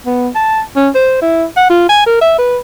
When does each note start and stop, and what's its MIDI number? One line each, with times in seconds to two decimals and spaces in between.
0.06 0.29 59
0.35 0.61 81
0.76 0.89 61
0.95 1.18 72
1.22 1.44 64
1.57 1.69 78
1.70 1.87 65
1.89 2.03 80
2.06 2.20 70
2.21 2.33 76
2.38 2.58 71